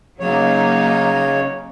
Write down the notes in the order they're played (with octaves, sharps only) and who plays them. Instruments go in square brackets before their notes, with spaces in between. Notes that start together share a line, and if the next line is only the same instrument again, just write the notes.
[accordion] C#3 C#5 [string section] F#3 A#3 D#4